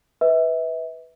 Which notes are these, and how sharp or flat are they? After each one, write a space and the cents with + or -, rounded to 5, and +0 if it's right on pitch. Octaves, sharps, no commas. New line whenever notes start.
B4 +0 E5 -35